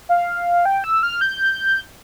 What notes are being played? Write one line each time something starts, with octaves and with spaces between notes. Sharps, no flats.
F5
G5
E6
F6
G6